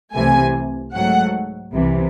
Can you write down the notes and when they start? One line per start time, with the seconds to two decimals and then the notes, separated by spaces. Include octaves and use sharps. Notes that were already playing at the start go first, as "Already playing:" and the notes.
0.14 C2 C3 E3 A3 G#5
0.94 G#2 F#3 A3 F#5
1.75 C2 C3 E3